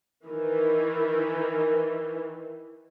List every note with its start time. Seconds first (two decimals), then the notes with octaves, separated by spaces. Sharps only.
0.24 D#3 E3